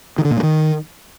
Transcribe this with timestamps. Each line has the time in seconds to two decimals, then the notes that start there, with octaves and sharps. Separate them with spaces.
0.18 D#3
0.25 D3
0.31 A#2
0.37 G2
0.43 D#3